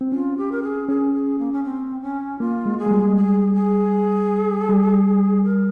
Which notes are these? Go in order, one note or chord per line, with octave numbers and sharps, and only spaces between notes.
C4
C#4 F4
G4
A#4
G#4
C#4 G#4
G#4
A#3
C#4
C4
C#4
A#3 F4
G#3
G#4
G#3
G3
G#4
G#4
G3
A#4